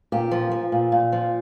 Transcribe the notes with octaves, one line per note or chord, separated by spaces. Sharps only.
A#2 G4
F3
F3
A#2
A#2
F3